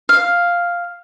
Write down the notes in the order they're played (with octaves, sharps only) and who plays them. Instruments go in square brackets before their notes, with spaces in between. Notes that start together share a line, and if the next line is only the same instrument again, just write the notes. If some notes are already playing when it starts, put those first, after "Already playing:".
[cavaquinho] F5